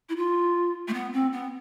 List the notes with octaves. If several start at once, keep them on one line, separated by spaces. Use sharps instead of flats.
E4
F4
A3
B3
C4
B3